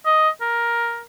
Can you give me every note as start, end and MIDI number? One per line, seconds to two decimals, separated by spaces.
0.06 0.30 75
0.41 1.03 70